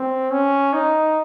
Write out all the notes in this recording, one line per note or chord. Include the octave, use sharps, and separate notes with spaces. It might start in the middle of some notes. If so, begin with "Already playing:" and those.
Already playing: C4
C#4
D#4